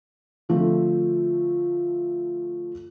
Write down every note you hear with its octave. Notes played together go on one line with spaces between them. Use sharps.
D3 F3 A3 C4